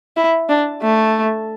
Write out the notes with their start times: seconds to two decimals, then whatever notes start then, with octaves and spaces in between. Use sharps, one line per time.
0.17 E4
0.49 D4
0.82 A3